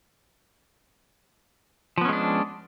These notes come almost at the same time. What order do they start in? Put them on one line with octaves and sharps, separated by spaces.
F3 B3 C#4 G#3 D4